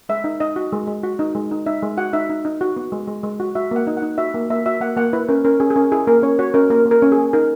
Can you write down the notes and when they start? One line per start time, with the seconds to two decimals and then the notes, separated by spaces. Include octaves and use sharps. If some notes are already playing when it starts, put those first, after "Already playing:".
0.09 G#3 E5
0.24 D#4
0.40 D#4 D#5
0.56 F#4
0.72 G#3
0.87 G#3
1.03 F#4
1.19 D#4
1.35 G#3
1.51 D#4
1.66 D#4 E5
1.82 G#3
1.97 F#4 F#5
2.13 D#4 E5
2.30 D#4
2.45 D#4
2.61 F#4
2.77 B3
2.92 G#3
3.08 G#3
3.23 G#3
3.40 F#4
3.55 F#4 E5
3.71 A#3 F#5
3.87 D#4
3.97 F#5
4.02 D#4
4.18 F#4 E5
4.34 A#3
4.50 A#3 E5
4.66 F#4 E5
4.81 A#3 F#5
4.97 A#3 F#5
5.13 E4 B4
5.29 C#4 A#4
5.45 C#4 A#4
5.60 C#4 G#4
5.70 G#4
5.76 C#4 A#4
5.92 E4 G#4
6.07 A#3 A#4
6.22 C#4 C#5
6.39 F#4 C#5
6.54 C#4 A#4
6.70 A#3 A#4
6.85 A#3
6.91 A#4
7.02 C#4
7.12 G#4
7.18 A#3
7.33 D#4 A#4